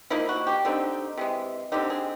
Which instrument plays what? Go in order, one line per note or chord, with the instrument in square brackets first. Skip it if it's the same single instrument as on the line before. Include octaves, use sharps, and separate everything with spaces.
[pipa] F3 A#3 D#4 E4
F#4
G4
D3 G3 C4 D#4
C3 E3 G#3
D3 G3 C4 D#4 G4
G#4